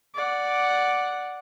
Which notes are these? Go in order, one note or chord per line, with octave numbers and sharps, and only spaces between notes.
D5 F#5